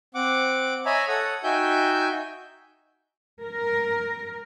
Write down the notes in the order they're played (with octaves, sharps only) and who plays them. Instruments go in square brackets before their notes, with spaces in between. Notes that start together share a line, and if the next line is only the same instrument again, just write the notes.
[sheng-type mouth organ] C4 F#5 D6
C#5 D#5 E5 G#5 A#5 B5
A4 C#5 F#5 D#6
D#4 F#4 E5 G5 G#5 G6
[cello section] A#4